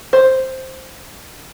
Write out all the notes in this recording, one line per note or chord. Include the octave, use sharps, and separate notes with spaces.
C5